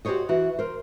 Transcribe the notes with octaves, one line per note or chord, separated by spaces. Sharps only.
F#4 G4 A4 C5 C#5 D#5
E3 F#4
A#4 C5